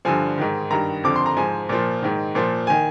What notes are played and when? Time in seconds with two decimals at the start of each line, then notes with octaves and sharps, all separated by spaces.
0.05 G2 D3 F3 G#5
0.38 G#2 D#3
0.71 G2 D#3 A#5
1.03 F2 D3 F3 D6
1.16 C6
1.26 A#5
1.36 G#2 F3 G#5
1.69 A#2 F3
2.02 G#2 D#3
2.35 A#2 F3
2.67 D#3 G#5